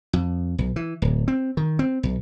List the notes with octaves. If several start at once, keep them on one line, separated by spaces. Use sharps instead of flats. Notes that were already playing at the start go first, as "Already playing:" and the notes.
F2
B1
E3
D1
C4
D#3
C4
B1